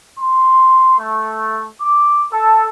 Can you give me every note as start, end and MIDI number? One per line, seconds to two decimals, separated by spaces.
0.18 0.97 84
0.98 1.66 57
1.80 2.25 86
2.31 2.67 69